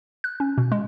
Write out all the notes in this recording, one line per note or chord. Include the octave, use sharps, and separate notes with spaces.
F#6
C#4
B2
G#3